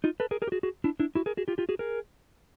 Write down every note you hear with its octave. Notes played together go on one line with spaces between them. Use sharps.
D#4 F4
A4 B4
G#4 A#4
G#4 A#4
G4
F#4 G#4
F#4 G#4
D4 E4
D4 E4
E4 F#4
G#4 A#4
F#4 G#4
F4 G4
F4 G4
F#4 G#4
G#4 A#4